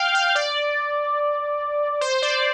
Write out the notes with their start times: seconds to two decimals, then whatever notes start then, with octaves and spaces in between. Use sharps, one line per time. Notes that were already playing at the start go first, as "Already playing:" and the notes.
Already playing: F5 G5 F6 G6
0.15 F5
0.35 D5
2.01 C5
2.22 D5